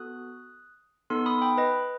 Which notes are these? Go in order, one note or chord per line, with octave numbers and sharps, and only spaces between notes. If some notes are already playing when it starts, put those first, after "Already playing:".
Already playing: B3 F#4 A4 D#6 F#6
B3 D#4 A4 C6 E6
B5 D#6
G5 B5
B4 D#5